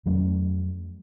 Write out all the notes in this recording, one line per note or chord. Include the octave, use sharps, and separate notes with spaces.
F2 F#3 A3 C#4